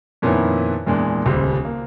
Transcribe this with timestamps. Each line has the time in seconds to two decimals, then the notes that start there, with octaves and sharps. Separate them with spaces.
0.22 F2 A#2 D#3 B3 C#4 E4
0.87 E2 A#2 G#3 D4
1.25 D#1 C#2 G3 C5
1.65 A#3